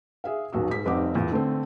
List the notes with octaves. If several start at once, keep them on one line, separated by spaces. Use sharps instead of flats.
G#4 E5 F5
D#1 B1 F#4 E6
G#2 B6
F1 G3 C4 D#4 F#5 D6
E2 A#2
D3 A3 C4